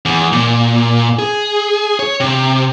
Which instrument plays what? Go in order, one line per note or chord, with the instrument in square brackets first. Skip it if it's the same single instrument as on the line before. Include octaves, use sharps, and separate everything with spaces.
[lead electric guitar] E2
A#2
G#4
C#5
C3